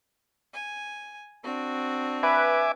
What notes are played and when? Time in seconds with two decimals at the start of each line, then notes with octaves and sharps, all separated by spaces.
0.52 G#5
1.44 C4 D4 F#4
2.23 B4 E5 G#5 D6